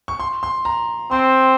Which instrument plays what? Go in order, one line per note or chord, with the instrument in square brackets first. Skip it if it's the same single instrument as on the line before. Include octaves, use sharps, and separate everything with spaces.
[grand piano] C#6
C6
C6
A#5
[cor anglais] C4 [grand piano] C6